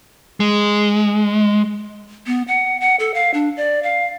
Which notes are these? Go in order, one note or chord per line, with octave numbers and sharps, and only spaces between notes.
G#3
B3
F#5
F#5
A4
F5
D4
D5
F5